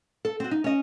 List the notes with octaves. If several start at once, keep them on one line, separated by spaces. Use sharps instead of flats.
A4
C4 F#4
D#4
C#4 D#5